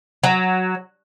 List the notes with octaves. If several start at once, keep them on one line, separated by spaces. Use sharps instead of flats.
F#3